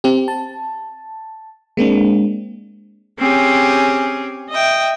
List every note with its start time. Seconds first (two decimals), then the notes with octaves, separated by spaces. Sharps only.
0.04 C4 G4
0.28 A5
1.77 G#3 A#3 C4 D4
3.18 C4 C#4 G4 G#4
4.50 D#5 E5 G5